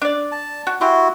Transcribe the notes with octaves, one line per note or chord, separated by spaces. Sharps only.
D4 D5
A5
F#4
E4 F#4 G4 C6